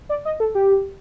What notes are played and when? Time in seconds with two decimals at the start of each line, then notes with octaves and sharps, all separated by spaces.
0.09 D5
0.25 D#5
0.40 A4
0.55 G4